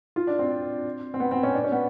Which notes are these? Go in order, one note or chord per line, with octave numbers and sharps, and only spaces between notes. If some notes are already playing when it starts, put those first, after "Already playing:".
F4
D4
C4
C4
B3
C4
C#4
D4
C#4
B3